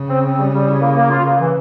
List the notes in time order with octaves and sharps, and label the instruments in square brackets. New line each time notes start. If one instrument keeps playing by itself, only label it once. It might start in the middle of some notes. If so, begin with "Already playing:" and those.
Already playing: [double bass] C#3
[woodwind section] C4
C4
G3
G3
E4
A#3
A#3
F4
A#3
E3